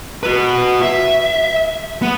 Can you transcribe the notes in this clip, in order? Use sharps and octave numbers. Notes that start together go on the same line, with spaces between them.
F#4 B4
E5
B3